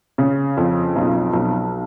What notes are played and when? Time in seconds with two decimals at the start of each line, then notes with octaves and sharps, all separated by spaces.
0.18 C#3
0.57 F2
0.96 B1
1.33 B1